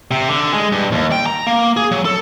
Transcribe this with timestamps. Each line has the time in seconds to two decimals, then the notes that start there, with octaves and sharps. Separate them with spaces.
0.11 C3
0.29 D3
0.54 G#3
0.72 G2
0.92 D#2
1.12 G5
1.26 A#5
1.47 A#3
1.77 G#4
1.92 F#3
2.05 A4